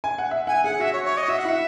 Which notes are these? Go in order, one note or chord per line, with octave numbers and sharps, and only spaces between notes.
G#5
F#5
E5
F#5 G#5
G#4 F#5
F#4 E5
C#5
C#5
D#5
F#4 E5
F#5
E4 E5